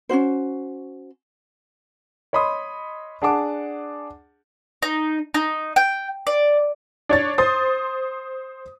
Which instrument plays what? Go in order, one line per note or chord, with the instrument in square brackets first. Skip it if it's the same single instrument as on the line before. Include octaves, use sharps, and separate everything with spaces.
[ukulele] C#4 D#4 F#4 C5
[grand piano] C#5 D#5 B5 C6 D#6
D4 G#4 F#5 A5 D6
[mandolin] D#4
D#4
G5
D5
[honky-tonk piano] D4 C#5 A6
C5 C6 D#6 A6